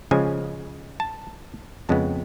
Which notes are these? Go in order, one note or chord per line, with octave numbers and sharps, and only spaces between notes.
C#3 F3 G#3 G#5
A5
F2 C#3 G#3 B3 A5